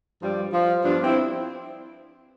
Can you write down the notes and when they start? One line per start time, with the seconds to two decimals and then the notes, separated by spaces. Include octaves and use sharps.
0.22 G2 F3 G3
0.53 F3
0.83 G2 F3 B3 D4
1.04 C4 E4